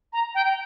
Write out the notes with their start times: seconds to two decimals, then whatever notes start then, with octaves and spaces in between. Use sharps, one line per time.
0.13 A#5
0.35 G5